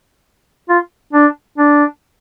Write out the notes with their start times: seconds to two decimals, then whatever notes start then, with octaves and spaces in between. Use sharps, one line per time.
0.69 F4
1.13 D4
1.58 D4